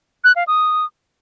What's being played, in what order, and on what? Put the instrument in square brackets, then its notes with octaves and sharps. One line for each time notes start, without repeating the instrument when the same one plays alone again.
[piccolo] F#6
F5
D#6